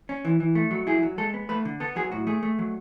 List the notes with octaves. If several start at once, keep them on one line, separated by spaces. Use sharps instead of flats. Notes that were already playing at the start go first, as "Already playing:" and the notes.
C#4
E3
E3
A3
F#3
E4 G#4
F#3
G#3 A4
B3
A3 B4
D3
B3 A4
F#3 G#4
A2 F#4
A3 G#4
A3
F#3